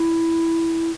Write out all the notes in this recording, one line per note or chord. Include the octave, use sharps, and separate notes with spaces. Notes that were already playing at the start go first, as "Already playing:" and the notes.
Already playing: E4